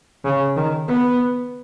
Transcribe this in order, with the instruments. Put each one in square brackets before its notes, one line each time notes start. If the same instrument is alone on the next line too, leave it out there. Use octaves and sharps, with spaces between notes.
[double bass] C#3
D#3
B3